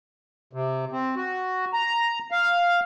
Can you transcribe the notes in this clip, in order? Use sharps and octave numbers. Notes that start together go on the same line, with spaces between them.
C3
C4
F#4
A#5
F5